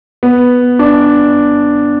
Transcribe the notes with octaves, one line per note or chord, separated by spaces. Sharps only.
B3
D4